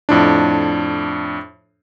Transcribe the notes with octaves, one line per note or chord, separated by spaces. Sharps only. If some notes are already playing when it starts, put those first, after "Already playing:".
F2 A2 D4